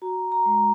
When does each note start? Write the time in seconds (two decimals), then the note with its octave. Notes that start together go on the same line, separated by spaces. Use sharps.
0.02 F#4 A#5
0.32 A#5
0.46 G#3